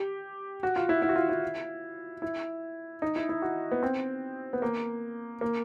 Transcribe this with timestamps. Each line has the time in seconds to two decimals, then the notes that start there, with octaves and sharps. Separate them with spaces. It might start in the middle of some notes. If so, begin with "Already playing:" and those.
Already playing: G4
0.63 F#4
0.76 F4
0.89 E4
1.02 E4
1.09 F#4
1.16 F4
1.29 E4
2.22 E4
3.02 D#4
3.16 E4
3.29 E4
3.42 F#4
3.71 B3
3.83 C4
4.53 B3
4.62 A#3
5.41 A#3